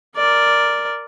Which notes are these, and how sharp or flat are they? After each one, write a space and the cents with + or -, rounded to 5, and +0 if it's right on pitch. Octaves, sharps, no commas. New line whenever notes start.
A#4 +0 D5 +0